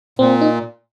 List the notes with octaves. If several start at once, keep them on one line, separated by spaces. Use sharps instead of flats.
A#2 C4
D#4